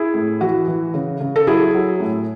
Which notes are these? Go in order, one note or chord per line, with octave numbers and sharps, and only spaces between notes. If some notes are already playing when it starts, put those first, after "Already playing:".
Already playing: E4 G#4
A2
E3 F#4
E3
C#3
C#3
A4
F#3 E4 G#4
F#3
A2